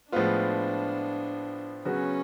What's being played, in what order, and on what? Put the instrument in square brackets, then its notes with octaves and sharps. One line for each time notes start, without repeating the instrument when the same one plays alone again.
[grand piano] A2 F3 G#3 B3 F4 [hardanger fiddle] D4
[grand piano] C#3 F#3 B3 F#4 [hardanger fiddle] C#4